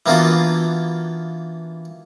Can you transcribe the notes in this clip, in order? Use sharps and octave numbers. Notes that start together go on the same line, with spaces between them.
E3 A#3 B3 D4 F4 F#4